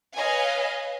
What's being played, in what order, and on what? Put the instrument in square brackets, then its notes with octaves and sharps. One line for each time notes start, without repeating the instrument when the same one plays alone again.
[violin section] B4 C#5 D#5 F5 G#5